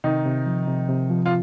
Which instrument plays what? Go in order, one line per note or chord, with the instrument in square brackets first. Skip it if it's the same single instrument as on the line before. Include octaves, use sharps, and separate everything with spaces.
[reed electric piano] C3 [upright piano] D#3 D#4
[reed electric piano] C3
F3
C3
C3
F3
[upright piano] F4